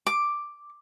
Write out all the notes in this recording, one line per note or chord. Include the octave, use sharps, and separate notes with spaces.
D6